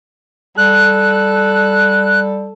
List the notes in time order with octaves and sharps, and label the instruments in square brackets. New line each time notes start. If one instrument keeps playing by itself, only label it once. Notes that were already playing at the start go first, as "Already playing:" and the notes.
[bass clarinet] G3 [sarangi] A4 [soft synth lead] F#6